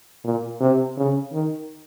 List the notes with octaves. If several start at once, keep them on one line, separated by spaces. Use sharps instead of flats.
A#2
C3
C#3
D#3